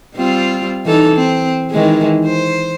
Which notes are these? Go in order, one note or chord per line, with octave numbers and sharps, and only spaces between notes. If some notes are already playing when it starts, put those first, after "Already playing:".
G3 C4 F4
E3 D#4 A4
C4
D#3 E3 G#3
C5